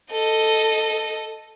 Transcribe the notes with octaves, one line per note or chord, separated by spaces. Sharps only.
A4 D#5